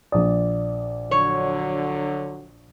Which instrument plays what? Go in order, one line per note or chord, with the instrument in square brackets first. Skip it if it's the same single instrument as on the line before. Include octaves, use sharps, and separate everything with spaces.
[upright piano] A#1 D#6 [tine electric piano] D5
[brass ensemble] D3 F#3 [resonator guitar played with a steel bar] C#5